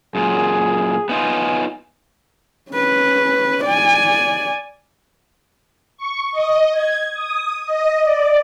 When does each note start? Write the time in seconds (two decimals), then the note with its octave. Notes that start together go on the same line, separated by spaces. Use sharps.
0.15 F#2 A#2 G#4
1.09 B3 D#4 F4 G#5
2.71 C#4 B4
3.64 D5 G#5
5.97 C#6
6.32 D#5
6.71 G#6
7.13 D#6
7.66 D#5
8.03 D5